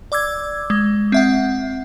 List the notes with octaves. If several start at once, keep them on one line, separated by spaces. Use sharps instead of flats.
D5 D6 E6 G#6
G#3
C4 E5 F#5